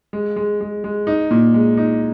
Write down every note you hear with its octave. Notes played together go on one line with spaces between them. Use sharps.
G#3
G#3
G#3
G#3
D#4
A#2
G#3
D#4